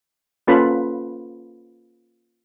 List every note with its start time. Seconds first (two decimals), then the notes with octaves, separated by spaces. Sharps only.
0.47 A#3 C#4 F4 A4 B4 B5